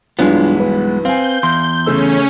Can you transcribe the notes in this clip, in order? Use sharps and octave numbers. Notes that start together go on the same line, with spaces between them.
B1 G2 E3 G#3 B3 D4 F4
B4
C4 F5 G#5 G6
E2 C6
C#3 A3 C#4 E6